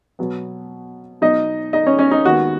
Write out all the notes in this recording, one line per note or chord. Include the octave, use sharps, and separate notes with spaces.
B2 F#3 B3
B2 F#3 B3 D#4 D#5
D#4 D#5
C#4 C#5
C#4 C#5
D#4
D#2 D#3 G#3 B3 F#4